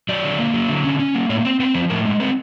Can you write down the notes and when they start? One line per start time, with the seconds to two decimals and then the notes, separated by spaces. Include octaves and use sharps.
0.09 F#3 D5
0.24 D3
0.39 A#3
0.54 F#3
0.69 D3
0.84 C#4
0.99 C#4
1.15 A#3
1.29 A2 C#5
1.45 C4 C5
1.60 C4 B4
1.74 F3 C5
1.90 A2 A#4
2.05 G#3
2.20 C4 B4